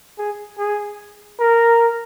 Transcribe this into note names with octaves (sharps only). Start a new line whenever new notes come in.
G#4
G#4
A#4